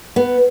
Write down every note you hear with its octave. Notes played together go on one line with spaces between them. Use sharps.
B3